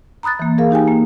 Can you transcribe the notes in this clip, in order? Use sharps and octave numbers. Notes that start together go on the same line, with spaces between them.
A#5 B5 D#6 F#6 A6
E3 A#3
G#4 A#4 F5
D#4 G4 G5 G#5
A#3